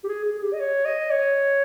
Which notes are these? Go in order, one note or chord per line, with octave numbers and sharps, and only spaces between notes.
G4
G#4
G#4
G#4
G4
D#5
C#5
D#5
C#5